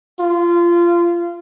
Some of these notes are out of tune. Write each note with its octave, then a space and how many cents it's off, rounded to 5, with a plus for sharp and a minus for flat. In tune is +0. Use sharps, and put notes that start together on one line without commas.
F4 -20